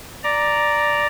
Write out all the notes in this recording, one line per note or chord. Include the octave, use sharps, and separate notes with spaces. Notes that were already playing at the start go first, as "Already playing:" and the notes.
D5 A#5